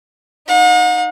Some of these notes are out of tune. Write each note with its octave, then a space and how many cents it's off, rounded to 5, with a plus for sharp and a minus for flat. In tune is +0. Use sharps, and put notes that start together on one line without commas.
D#4 +0 F#5 -45